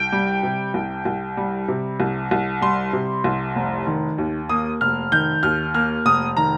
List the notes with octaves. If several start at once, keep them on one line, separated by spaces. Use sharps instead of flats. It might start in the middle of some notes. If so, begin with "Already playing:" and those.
Already playing: C2 G5
G3
C3
C2
C2
G3
C3
C2
C2
G3 C6
C3
C2
F1
D#3
D#2
A#3 D#6
F1 F6
D#3 G6
D#2 F6
A#3 F6
F1 D#6
D#3 A#5